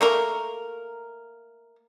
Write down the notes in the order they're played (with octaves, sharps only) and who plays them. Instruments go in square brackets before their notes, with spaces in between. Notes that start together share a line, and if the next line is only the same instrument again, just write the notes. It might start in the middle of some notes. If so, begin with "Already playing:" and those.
[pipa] A3 A#3 A#4